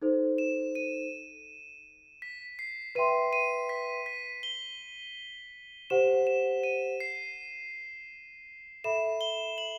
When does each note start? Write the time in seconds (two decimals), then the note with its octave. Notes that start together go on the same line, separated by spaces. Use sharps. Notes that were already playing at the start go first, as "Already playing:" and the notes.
0.02 D#4 A4 C5
0.38 E7
0.75 D#7
2.22 B6
2.59 C7
2.95 B4 E5 G5 C6 D#7
3.33 D#7
3.69 B6
4.06 B6
4.43 G7
5.90 G4 C5 F#5 E7
6.27 E7
6.63 D#7
7.00 C7
8.84 A4 E5 B5 E7
9.21 G7
9.58 F#7